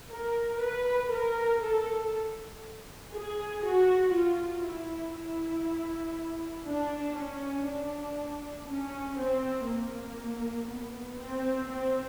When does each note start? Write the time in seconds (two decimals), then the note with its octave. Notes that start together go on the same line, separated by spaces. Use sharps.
0.10 A#4
0.61 B4
1.11 A#4
1.62 A4
3.13 G#4
3.64 F#4
4.13 F4
4.64 E4
5.15 E4
6.66 D4
7.16 C#4
7.67 D4
8.68 C#4
9.18 C4
9.68 A#3
10.70 B3
11.19 C4
11.69 C4